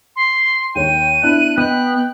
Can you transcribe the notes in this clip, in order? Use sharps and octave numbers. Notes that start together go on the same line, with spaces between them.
C6
D#2 C#5 G5 D#7
B3 D4 E4 F#6
B3 D#5 G5 F#6